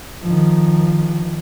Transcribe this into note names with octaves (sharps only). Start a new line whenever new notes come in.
D#3 F3